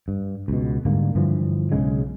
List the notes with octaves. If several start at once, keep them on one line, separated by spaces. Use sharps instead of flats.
G2
C#2 B2
G#2 D3 G3 A#3
G2 D3 E3 F3
B1 C#3 G#3